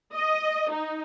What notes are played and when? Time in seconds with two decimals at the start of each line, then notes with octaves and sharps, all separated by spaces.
0.14 D#5
0.71 D#4